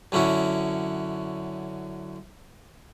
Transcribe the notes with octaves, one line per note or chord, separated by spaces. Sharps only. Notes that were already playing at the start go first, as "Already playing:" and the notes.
F#2 D3 C#4 E4 F#4